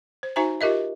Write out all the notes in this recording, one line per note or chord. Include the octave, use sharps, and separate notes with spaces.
C5
D#4 F#4 C5 E5 G#5 A#5
F4 G4 A#4 D#5 E5